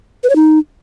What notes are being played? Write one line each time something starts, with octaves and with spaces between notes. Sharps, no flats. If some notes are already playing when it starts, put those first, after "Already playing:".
B4
C#5
D#4